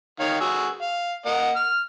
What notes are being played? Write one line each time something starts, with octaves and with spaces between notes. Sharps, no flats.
D#3 C#5 F5
F#4 G#4 E6
F5
A#3 D#5 F#5
F6